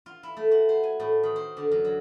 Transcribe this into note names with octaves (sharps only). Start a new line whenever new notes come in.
F4
E4
A3
F#4
C5
G#5
A2
D#3
C5
D3
F#2
F#3